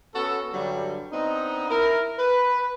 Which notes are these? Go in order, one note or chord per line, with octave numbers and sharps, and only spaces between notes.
B3 C#4 F#4 A4
G2 D3 F#3 G3
B3 C4 D4 D#4
E4 A#4
B4